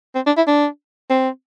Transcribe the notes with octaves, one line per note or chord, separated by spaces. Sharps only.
C4
D4
E4
D4
C4